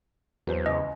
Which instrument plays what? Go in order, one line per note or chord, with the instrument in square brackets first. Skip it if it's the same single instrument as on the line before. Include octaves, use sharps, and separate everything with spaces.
[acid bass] E2 [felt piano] F#3 B4 C5
[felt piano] C#2 [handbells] D#5